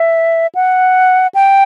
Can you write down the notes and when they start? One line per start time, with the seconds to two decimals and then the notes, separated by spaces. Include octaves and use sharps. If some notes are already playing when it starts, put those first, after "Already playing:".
Already playing: E5
0.55 F#5
1.35 G5